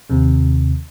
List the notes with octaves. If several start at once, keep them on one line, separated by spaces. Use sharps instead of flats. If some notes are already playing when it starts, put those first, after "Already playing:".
D#2 C3